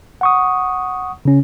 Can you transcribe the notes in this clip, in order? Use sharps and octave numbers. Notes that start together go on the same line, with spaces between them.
F#5 C#6 D#6
C#3 C#4